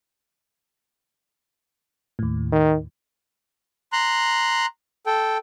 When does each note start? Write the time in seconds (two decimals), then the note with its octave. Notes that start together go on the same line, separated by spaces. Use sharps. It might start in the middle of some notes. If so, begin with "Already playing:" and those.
2.19 D#2 A2
2.52 D#3
3.92 A#5 C6 F#6
5.06 A4 G5